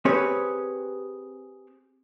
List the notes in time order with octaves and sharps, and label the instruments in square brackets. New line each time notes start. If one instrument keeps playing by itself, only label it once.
[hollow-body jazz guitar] C4 G4 G#4 B4 C#5